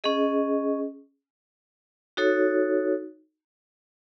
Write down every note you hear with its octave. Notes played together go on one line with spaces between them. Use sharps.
C#4 G#4 D#5
D#4 F#4 A4 C#5